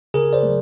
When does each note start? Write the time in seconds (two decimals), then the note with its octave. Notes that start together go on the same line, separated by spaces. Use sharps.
0.14 C#3 G#4 A#4
0.33 C5 D5
0.43 F#3 A3